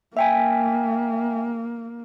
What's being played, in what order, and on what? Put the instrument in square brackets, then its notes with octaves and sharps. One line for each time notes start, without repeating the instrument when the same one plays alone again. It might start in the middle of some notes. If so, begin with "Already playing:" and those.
[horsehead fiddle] A#3 [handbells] E5 G5 G#5